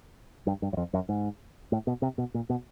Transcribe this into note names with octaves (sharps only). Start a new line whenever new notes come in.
G2
G2
F#2
F2
F#2
G#2
A2
B2
C3
B2
A#2
B2